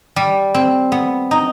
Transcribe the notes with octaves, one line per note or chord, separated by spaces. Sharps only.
G3
C4
B3
D#4